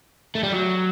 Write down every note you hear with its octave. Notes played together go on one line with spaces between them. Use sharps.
A3
G3
F#3